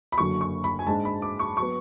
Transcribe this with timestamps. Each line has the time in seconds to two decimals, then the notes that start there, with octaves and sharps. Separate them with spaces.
0.12 B5
0.18 F#1 F#2 D3 F#3 C#6
0.41 C#6
0.64 B5
0.79 G#5
0.87 G#2 G#3 D4 A5
1.05 B5
1.22 D6
1.39 C#6
1.57 F#3 B3 C#6